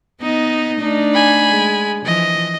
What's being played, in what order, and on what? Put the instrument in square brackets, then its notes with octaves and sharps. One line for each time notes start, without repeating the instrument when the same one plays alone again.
[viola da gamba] B3 D#4 [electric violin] D#5
[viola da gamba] A3 D4 D#4
[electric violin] G#5 B5
[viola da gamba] G#3
[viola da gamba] E3 F3 [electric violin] D#5